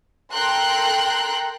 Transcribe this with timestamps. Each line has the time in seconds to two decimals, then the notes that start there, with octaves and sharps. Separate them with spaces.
0.33 A4 A#4 G5 A#5 C6 F#6